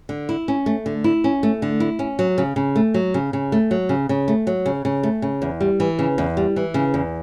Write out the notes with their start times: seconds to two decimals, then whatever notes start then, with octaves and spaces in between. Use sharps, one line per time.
0.09 D3
0.29 E4
0.48 C#4
0.66 A3
0.86 D3
1.04 E4
1.24 C#4
1.43 A3
1.62 D3
1.80 E4
1.99 C#4
2.19 F#3
2.38 C#3
2.56 C#3
2.76 A3
2.94 F#3
3.14 C#3
3.33 C#3
3.52 A3
3.71 F#3
3.89 C#3
4.09 C#3
4.28 A3
4.47 F#3
4.66 C#3
4.85 C#3
5.03 A3
5.22 C#3
5.42 E2
5.61 G3
5.80 E3
5.99 C#3
6.18 E2
6.37 G3
6.56 E3
6.74 C#3
6.94 E2